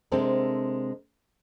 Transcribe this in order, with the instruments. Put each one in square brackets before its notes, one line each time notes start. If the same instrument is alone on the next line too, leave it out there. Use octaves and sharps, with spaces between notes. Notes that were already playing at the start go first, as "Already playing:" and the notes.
[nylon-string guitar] C3 G#3 C4 D4 A4 A#4